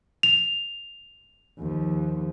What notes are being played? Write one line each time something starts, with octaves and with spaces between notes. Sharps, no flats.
F7
D#2 F3